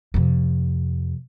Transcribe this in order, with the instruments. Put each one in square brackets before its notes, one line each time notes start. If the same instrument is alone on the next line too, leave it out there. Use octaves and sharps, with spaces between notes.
[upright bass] F2 C3